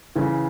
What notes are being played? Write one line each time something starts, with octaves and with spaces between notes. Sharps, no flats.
C#3 E3